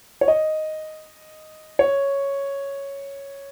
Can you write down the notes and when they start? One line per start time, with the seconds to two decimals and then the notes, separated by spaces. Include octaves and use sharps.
0.21 C#5
0.28 D#5
1.79 C#5